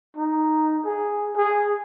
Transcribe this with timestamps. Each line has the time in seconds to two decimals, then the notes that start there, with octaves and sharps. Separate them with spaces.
0.17 D#4
0.85 G#4
1.37 G#4